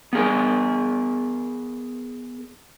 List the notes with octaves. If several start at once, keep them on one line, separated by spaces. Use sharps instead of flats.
B3 G#4 A#4